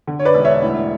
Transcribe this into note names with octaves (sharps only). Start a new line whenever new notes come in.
D3
C#5
B4 D5
E1
C#5 E5
A2